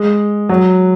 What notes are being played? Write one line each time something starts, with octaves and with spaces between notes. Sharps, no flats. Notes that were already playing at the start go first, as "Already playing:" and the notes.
Already playing: G#3
F#3